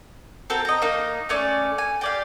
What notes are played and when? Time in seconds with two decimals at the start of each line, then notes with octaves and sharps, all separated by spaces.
0.50 C4 F#4 A4 A#4
0.65 D#5 A#5
0.82 A#3 D#4
1.29 A3 C#4 D5
1.78 G#5
2.01 G4 D5 F5